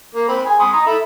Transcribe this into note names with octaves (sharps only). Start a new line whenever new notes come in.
A#3
C4 B5
G#4 G#5
B5 C6 D#6
A#5 D#6
A4 E5 B5